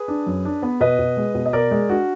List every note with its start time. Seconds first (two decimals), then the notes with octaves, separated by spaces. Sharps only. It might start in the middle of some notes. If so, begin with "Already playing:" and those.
Already playing: G#4 B4
0.08 D4
0.26 F#2
0.45 D4
0.62 B3
0.80 B2 B4 D#5
0.99 B2
1.17 G#3
1.34 B2
1.46 D#5
1.53 B2 A#4 D5
1.71 G#3
1.89 D4 F#4